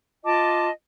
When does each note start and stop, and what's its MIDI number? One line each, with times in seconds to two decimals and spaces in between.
0.24 0.69 65
0.24 0.69 75
0.24 0.69 81
0.24 0.69 86